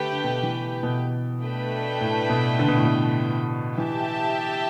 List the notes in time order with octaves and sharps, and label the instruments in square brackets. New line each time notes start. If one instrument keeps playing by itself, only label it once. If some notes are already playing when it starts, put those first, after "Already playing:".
Already playing: [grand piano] D3 [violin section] A3 G4 B4 G5
[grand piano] D3
B2
E3
B2
[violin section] A3 D4 B4 G5
[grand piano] A2
B2
D3
B2
A2
B2
[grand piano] E3 [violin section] G4 E5 A5